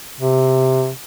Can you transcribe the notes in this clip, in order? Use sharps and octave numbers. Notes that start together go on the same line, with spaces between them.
C3